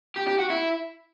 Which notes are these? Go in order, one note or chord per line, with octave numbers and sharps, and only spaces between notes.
G4
G4
F#4
E4